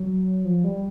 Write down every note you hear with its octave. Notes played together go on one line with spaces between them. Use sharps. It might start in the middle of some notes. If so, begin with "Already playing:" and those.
Already playing: F#3
F3
G3